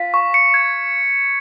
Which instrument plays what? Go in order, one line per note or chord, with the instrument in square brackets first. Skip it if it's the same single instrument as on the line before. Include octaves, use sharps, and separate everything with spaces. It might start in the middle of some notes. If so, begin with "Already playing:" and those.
Already playing: [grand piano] F4 [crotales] B6
[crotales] C#6
C#7
G#6